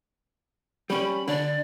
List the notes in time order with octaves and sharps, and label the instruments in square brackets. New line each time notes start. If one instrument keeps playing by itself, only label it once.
[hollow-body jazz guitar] G3 C#4 [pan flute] B5
[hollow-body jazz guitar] D3 [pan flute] D5